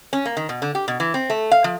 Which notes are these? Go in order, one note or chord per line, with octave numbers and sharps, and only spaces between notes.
C#4
A#3
D#3
B2
D3
G4
B2
E3
C4
A3
F5
F3